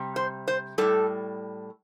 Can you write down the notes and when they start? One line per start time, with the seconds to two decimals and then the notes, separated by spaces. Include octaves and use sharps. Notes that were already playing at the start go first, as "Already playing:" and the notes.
Already playing: C3 G3
0.16 C5
0.48 C5
0.78 A2 G3 A4